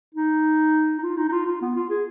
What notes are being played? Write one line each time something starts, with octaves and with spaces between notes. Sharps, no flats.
D#4
D#4
F4
D#4
D#4
F4
F4
B3
F4
G#4